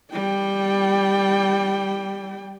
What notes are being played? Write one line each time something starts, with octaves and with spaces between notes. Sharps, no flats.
G3 G5